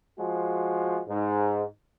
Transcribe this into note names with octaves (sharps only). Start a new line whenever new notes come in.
F3 G#3 F#4
G#2